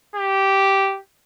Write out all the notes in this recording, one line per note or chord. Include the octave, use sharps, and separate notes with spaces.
G4